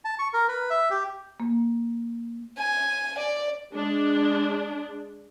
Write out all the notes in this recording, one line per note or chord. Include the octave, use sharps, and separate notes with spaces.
A5
C#6
A#4
B4
E5
G4
A#3
G#5
D5
G#3 D4